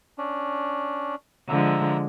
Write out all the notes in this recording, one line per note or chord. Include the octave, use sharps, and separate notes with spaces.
C#4 D4
D3 F3 G#3 E5 A#5